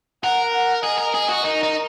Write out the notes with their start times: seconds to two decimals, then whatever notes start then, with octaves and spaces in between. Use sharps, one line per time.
0.23 A#4 F#5
0.53 F#5
0.84 G#4 D#5
0.98 A#4
1.14 G#4
1.29 F#4
1.44 D#4 A#4
1.63 D#4